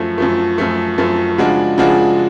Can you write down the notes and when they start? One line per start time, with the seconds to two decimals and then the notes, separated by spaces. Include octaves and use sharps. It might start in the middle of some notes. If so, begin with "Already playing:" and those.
Already playing: F#2 F3 A3
0.18 F#2 F3 A3
0.58 F#2 F3 A3
0.98 F#2 F3 A3
1.38 C#3 F3 G#3 D4 F#4
1.78 C#3 F3 G#3 D4 F#4